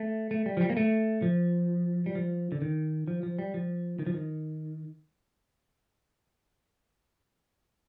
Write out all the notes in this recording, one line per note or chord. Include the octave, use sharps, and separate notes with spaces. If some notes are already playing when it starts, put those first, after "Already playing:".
Already playing: A3
A3
G3
F3
G3
A#3
A3
F3
G3
F3
D3
D#3
F3
F3
G3
F3
D#3
F3
D#3